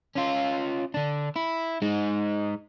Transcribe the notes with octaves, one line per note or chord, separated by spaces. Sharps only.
C#4 F4
D3 D4
E4
G#3 D#4